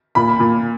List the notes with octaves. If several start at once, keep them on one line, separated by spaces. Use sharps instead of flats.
A#2 B5
A#2